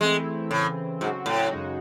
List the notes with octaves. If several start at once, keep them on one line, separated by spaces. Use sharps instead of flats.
E3 G#3 A3 C4 E4
A2 C#3 E3 C4
G#2 C#3 F#3 C4 F#4
A2
F#2 C#3 G#3 D#4 F#4